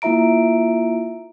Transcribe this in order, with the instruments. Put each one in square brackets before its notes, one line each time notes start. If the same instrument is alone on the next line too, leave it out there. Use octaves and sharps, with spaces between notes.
[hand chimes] A#3 E4 F4 E5 A#5 D7